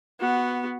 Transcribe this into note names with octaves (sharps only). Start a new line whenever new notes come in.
B3 F#4